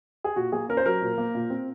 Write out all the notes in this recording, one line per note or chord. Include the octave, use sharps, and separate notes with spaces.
G#4
A#2 F#4
A#3 G#4
C#4 A#4
C5
F#3 A#4
A#2
A#3
A#2
C4